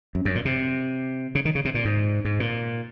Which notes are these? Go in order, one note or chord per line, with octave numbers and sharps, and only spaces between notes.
F#2
F#2
A#2
C3
C#3
D#3
C#3
C3
A#2
G#2
G#2
A#2